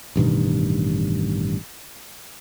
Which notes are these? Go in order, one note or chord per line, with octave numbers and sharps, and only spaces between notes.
A1 G2 B2 D#3